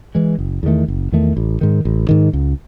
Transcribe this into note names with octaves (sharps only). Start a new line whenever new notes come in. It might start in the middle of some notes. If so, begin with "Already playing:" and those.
E3 G#3
F#1
E2 D#3 A3
F#1
E2 D#3 A3
A1
G#2 D#3
A1
G#2 D#3
C#2